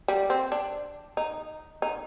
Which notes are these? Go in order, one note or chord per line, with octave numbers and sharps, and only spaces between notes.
G3
C4
D4
D#4
D#4